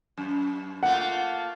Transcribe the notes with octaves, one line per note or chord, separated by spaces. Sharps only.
F#2
A3 A#3 F4 F#5